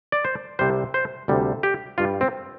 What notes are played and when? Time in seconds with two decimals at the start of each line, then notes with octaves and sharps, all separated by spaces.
0.12 D5
0.25 C5
0.59 C2 C3 G3 C5
0.94 C5
1.28 D2 C3 G3
1.63 G4
1.98 G2 G3 F4
2.21 C4